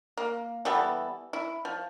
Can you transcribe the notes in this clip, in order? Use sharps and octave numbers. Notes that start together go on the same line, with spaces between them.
A#3
E3 G3 B3 A4
E4
F3